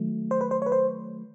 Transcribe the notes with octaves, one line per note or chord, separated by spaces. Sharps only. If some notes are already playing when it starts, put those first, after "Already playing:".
Already playing: D#3 F#3 A3
C5
B4
C5
C#5
B4
C5